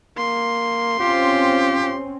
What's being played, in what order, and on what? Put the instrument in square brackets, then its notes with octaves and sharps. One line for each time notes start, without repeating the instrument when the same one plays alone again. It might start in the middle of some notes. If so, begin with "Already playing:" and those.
[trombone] A#3 [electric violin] C6
[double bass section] C4 C#4 [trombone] F4 [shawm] G4